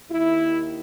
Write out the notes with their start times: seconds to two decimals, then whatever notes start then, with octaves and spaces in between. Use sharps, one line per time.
0.10 D#2 D#3 E4